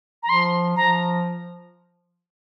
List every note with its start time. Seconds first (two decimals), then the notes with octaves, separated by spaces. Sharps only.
0.23 A#5
0.29 F3 C6
0.76 F3 A#5